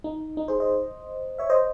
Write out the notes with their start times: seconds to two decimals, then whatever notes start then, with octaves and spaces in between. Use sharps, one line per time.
0.04 D#4
0.37 D#4
0.48 G#4 C5
0.60 C5 D#5
1.39 C#5 E5
1.50 C5 D#5